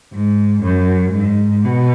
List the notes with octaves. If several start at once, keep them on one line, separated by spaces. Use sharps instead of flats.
G#2
F#2
G#2
B2